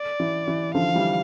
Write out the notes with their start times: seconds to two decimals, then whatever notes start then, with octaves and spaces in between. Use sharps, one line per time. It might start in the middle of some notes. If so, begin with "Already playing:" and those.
Already playing: D5
0.20 E3
0.48 E3
0.74 D3 F3 F5
0.95 E3 G3